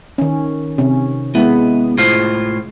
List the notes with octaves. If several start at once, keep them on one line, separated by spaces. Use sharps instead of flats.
D#3 C#4
C3 C#4
G#3 B3 E4
A2 F4 C5